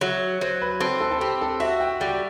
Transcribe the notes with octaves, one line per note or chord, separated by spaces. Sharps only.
F#3 E5
F#3 C5
B4
C4 A4
A4
A4
C4 G4
A4
F#4 E5
G5
G3 G5